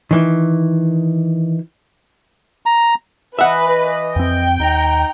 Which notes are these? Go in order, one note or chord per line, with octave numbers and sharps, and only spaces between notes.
D#3 E3
A#5
E3 B4 D#5 E5 F#5
F2 C4 G5
D#2 D#4 A#5